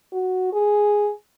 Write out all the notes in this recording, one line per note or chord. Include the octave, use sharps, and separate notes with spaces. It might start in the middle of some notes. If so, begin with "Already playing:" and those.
F#4
G#4